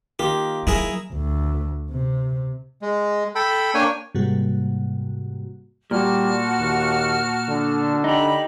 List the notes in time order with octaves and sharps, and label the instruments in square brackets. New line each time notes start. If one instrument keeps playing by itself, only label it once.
[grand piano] D#3 A#3 F4 [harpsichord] G4
[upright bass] F#3 [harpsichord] E4 G#4 A#4
[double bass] D2
C3
[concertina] G#3
A4 G5 B5
A#3 D4 C#5 G5 G#5
[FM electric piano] G#2 C3 G3 A#3 F#4
[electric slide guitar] A#2 [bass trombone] G3 [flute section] F#4 A5 F6
[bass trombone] D#2
D3
[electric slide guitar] D#4 G4 [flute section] B5